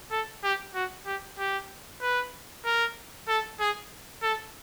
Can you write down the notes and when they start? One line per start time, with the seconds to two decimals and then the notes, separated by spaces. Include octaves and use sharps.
0.12 A4
0.44 G4
0.75 F#4
1.07 G4
1.39 G4
2.02 B4
2.66 A#4
3.28 A4
3.60 G#4
4.23 A4